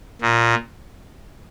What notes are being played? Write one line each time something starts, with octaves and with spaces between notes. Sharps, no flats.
A#2